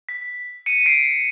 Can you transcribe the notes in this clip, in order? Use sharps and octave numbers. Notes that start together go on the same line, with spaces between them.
B6
C#7 D#7
C7 D7